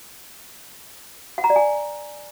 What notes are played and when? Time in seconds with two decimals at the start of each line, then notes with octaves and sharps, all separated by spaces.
1.38 F#5
1.44 A#5
1.50 D5
1.56 G#5